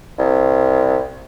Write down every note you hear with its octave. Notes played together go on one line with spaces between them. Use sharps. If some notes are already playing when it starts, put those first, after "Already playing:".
C2